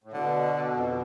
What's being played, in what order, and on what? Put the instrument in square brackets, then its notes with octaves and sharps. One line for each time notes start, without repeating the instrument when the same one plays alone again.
[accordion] A2
[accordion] B2 [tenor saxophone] D3
[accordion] F2